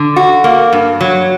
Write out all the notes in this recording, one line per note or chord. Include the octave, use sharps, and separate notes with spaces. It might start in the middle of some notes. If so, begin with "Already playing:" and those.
Already playing: D3
F#4
A#3
G2
F#3